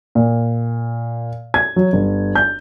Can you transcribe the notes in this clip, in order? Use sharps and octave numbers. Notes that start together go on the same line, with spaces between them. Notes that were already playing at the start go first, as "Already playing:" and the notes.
A#2
G#6
F#3
G1
G6